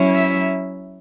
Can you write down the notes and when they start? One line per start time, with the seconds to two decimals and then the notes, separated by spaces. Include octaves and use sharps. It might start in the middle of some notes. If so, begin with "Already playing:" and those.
Already playing: F#3 C#4 E4
0.14 E5